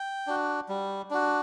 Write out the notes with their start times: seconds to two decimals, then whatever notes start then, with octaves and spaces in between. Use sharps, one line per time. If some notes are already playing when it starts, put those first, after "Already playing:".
Already playing: G5
0.27 D4 F#4
0.69 G3
1.11 D4 F#4